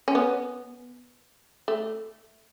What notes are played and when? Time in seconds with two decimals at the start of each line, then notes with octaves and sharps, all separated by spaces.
0.08 C#4
0.15 B3
1.68 A3